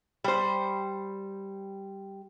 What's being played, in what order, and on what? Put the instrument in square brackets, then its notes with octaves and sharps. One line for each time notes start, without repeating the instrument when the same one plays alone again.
[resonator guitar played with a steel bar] G3 C5